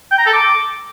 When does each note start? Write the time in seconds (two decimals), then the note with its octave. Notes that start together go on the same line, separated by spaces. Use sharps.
0.12 G5
0.19 A#5
0.26 A4
0.33 D6